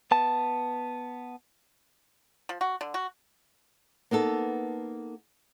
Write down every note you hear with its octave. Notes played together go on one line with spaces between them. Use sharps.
B3 A5
F3
F#4
D3
F#4
A#3 B3 D#4 A4